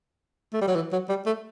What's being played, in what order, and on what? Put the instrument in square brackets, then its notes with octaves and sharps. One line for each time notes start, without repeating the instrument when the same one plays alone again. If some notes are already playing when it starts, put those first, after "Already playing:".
[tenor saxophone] A3
G3
F#3
E3
F#3
G3
A3